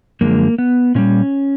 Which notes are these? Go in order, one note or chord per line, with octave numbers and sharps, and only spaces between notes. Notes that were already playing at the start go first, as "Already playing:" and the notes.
F#2 D3 F3 G#3 A#3
B3
A#2 G3 C#4